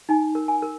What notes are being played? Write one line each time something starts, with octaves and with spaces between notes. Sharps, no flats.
D#4 G#5
A#4
G#5
A#4